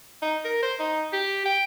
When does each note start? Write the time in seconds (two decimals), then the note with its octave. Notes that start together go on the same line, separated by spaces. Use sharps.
0.22 D#4
0.45 A#4
0.63 C5
0.79 D#4
1.13 G4
1.46 G5